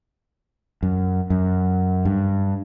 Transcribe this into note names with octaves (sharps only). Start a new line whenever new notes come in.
F#2
F#2
G2